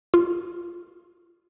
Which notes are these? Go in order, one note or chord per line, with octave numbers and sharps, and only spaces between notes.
F4